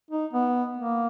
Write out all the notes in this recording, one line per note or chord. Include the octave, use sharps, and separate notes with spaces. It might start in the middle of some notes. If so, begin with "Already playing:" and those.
D#4
B3
A#3